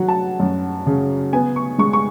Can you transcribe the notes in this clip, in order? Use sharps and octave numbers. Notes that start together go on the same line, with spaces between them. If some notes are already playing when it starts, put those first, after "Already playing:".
Already playing: F#3 F#5
A5
F#2
C#3
B3 G#5
C#6
G#3 C#6
C#6